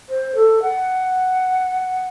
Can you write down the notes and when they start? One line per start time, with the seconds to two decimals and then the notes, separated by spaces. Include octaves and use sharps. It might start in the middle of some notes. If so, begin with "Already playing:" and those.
0.09 C5
0.35 A4
0.62 F#5